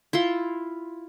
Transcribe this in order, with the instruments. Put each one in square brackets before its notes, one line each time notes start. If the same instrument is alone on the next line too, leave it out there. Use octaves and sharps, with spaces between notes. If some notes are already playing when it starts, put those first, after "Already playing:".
[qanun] E4 F4 C6